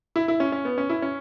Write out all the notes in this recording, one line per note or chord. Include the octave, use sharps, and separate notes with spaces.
E4
E4
C#4
C#4
B3
C#4
E4
C#4